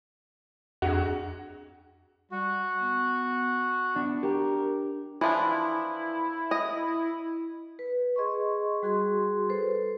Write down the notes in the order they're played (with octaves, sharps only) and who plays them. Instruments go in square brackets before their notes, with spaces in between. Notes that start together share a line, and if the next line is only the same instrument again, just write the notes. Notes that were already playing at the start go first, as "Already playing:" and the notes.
[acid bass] F2 [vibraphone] D4 G#4 [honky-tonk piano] F#4
[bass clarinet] G3 [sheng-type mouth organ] F#4
[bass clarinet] B3
[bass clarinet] B3 [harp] D4
[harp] G4 [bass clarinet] A#4
[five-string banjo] E3 F3 D4 [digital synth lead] E4
[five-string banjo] D#5
[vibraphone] B4
G#4 D#5 C6 C#6
G3 F#4 G#4 C6
A4 B4 C5